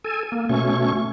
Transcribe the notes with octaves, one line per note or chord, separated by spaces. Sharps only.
A4 G#5
A#3
B2 A3 C#4 C#6